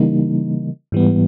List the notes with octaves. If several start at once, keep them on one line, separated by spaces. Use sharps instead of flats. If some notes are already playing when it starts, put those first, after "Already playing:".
Already playing: C#3 E3 G3 A#3 D#4
G#2 E3 G3 B3